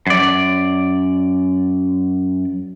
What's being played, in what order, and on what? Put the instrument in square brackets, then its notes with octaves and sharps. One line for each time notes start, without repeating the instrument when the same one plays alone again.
[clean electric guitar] F#2 D5